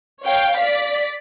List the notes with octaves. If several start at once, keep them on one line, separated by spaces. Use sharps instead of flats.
C#5 F5 G5
D5 B6